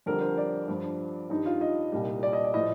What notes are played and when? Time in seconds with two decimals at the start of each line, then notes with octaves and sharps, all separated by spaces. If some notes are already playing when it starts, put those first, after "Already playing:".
0.06 F2 D3 G3 A#4
0.21 C5
0.38 D5
0.68 G2 F3
1.30 G2 D#3 G3 D#4
1.46 F4
1.61 D#5
1.92 C2 A#2 G3
2.23 D5
2.33 D#5
2.44 D5
2.54 A2 F3 D#5